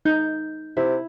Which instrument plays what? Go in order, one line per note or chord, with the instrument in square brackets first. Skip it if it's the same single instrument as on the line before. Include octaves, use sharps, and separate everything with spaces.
[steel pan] D#4 [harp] G6
[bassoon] C3 [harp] E4